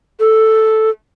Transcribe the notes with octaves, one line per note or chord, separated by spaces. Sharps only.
A4